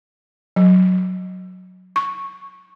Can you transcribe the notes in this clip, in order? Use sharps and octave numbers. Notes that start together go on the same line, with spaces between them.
F#3
C#6